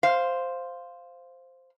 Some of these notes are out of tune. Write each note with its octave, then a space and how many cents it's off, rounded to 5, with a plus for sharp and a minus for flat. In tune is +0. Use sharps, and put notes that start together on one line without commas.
C5 +0 F5 +0